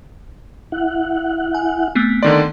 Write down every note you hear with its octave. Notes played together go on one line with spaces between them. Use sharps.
E4 F#5
G#5
A3 B3 C4
D3 D#3 D5 C6